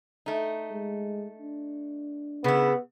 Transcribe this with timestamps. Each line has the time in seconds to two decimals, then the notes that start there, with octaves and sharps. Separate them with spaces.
0.26 A3 D#4
0.72 G#3
1.39 D4
2.44 C#3 B3 E4